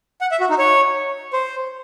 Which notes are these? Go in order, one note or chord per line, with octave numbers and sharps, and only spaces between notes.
F#5
E5
F#4
D#4
C#5
C5